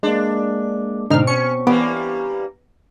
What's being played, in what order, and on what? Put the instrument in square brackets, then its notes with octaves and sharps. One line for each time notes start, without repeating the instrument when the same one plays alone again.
[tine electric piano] G#3 A#3 [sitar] D4
[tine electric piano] G#2 [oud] B2 C4 [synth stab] D3 D#4 F6
[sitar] C#4 [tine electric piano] C#6 [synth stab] C#7
[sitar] E3 G3 A#3 [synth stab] B3 [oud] D4 G4